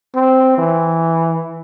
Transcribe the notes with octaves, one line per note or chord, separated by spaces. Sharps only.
C4
E3